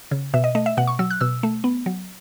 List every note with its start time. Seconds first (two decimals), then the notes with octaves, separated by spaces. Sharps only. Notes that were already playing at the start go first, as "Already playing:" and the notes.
0.11 C#3
0.34 B2 E5
0.44 D#5
0.55 A3 D#5
0.66 E5
0.77 B2 F#5
0.87 C#6
0.99 F#3 E6
1.10 F#6
1.21 B2 E6
1.43 A3
1.64 B3
1.86 F#3